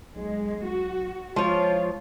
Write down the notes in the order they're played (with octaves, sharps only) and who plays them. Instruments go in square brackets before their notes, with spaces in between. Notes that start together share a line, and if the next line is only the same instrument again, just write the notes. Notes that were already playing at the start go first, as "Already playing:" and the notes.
[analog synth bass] B1 [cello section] G#3
[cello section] F#4
[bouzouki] F3 C#5 [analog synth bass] G#3 [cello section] F4